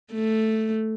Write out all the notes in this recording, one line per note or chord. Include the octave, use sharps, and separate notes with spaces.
A3